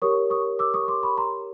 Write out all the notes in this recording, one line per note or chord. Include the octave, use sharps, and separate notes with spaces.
G4 A#4 C#5 C#6 D#6
C#6 D#6
D6 E6
C#6 D#6
C6 D6
B5 C#6
A#5 C6